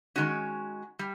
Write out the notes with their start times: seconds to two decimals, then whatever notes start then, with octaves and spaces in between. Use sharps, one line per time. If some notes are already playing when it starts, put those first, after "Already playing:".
0.16 D#3 G#3 C#4 F#4
0.99 G3